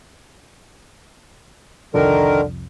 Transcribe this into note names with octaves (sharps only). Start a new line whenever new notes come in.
C2 F2 D3 D#3 F3 A#4